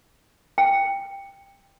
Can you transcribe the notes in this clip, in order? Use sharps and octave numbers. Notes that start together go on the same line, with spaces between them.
G5